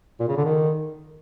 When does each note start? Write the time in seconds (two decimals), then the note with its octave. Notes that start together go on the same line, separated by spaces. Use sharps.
0.20 A#2
0.28 C#3
0.37 D3
0.45 D#3